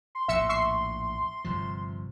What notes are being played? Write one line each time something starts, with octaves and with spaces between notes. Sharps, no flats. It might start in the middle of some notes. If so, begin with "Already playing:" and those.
C6
A#1 E2 A2 E5 E6 C#7
E5 C#6 C7
G1 C3 F3